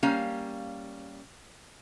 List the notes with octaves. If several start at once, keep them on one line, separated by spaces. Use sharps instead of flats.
G3 A#3 C#4 F5